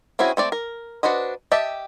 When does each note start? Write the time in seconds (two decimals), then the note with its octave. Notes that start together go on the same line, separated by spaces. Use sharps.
0.19 C4 C#4 E4 F#4 G#4
0.37 A3 C4 D5
0.52 A#4
1.03 D4 F#4 B4 C5 D#5
1.52 G4 D#5 E5 A5